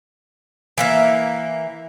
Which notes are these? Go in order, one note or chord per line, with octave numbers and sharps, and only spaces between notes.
E3 A#3 E5